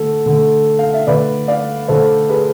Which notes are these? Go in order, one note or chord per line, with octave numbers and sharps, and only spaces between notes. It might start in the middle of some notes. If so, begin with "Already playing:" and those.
Already playing: D3 A3 A4
D3 A3
F5
E5
D3 A3 B4 D5
D5 F5
D3 A3 A4 C5
G#4 B4